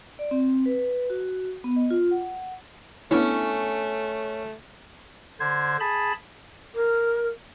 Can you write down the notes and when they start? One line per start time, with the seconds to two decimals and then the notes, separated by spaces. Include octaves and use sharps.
0.19 D5
0.31 C4
0.66 B4
1.10 F#4
1.64 B3
1.76 D#5
1.90 F4
2.11 F#5
3.11 A3 B3 C#4 D4 E4
5.40 D3 C5 G#6
5.80 G#4 A5 B5
6.75 A#4